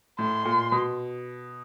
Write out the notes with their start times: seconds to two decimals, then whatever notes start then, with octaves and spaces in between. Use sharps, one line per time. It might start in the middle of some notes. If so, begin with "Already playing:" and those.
0.19 A2 C6
0.45 A#2
0.72 B2